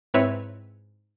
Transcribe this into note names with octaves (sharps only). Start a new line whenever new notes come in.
G#2 C4 E4 B4 C#5 E5